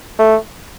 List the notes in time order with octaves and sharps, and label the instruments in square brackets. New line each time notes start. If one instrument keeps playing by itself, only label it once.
[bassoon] A3